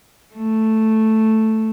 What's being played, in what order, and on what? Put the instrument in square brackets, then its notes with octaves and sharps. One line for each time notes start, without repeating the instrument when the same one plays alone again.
[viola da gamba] A3